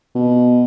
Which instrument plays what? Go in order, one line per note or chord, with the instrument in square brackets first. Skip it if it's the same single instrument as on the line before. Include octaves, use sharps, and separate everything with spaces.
[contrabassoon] B2